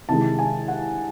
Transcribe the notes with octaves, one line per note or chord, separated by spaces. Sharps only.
C2 C3 D#3 G#3 A5
G#5
F#5